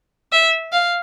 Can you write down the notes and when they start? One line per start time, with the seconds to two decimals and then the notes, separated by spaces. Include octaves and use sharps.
0.32 E5
0.72 F5